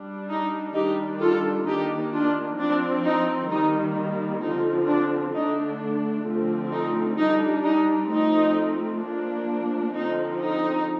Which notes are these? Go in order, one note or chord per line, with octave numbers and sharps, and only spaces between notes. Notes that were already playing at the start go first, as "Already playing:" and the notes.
Already playing: G3 D4
D#4
D#3 G3 D4 D#4 G4
F4 A4
D#3 A#3 D4 D#4 G4
D4 F4
F3 C4 D4
D#4
D#3 G3 A#3 D#4
D3 F3 C4 D#4
D4
D3 A3 D4 D#4
D3 F3 A3 C4
D#4
G3 D4 D#4
D#4
F3 A3 C4 D#4
F3 A#3 D4
D3 F3 C4 D#4
D#4